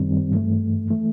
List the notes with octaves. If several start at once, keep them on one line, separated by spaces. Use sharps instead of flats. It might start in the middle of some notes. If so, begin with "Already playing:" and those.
Already playing: F#2 D#3 G3 C4
G2 E3 A3
E3 A3